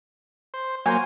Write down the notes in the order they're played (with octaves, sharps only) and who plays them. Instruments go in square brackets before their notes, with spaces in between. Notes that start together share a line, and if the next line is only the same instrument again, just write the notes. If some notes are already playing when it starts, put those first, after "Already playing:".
[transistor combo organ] C5
[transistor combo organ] F#3 A#3 [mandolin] C5 G#5